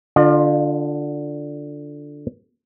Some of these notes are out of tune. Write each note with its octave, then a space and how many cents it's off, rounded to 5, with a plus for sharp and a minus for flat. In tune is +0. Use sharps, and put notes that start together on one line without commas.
D3 +0 F4 +15 D5 +45